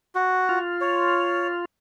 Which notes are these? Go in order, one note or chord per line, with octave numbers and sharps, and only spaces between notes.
F#4
F4
C#5